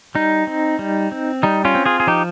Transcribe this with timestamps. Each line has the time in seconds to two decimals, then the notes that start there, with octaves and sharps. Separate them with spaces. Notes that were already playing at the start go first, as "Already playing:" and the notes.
0.15 G3 D#4
0.47 C4
0.79 G3
1.12 C4
1.43 G3 D#4
1.65 C#4 F4
1.75 C4
1.86 F4 G#4
2.00 G#4
2.07 F3 D#4 G4